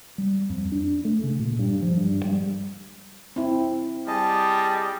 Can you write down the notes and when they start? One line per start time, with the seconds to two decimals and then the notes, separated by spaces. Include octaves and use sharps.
0.18 G3
0.50 F2
0.72 D4
1.05 A3
1.23 C#3
1.39 A#2
1.59 G2
1.82 F3
1.97 G2
2.25 G3
3.36 C4 E4
4.08 G3 G#4 D#5 A5